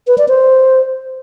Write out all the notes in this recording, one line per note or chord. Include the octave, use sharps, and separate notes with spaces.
B4
D5
C5